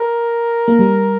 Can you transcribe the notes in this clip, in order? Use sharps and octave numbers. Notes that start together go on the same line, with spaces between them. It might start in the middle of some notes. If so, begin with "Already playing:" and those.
Already playing: A#4
A#3
G3